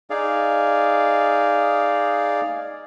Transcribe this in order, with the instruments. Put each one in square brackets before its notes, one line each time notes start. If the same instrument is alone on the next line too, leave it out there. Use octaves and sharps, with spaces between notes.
[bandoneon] D#4 G#4 D5 F5